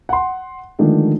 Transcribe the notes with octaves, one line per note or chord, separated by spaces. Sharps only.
F#5 C6
D3 D#3 F3 G#3 A3 D4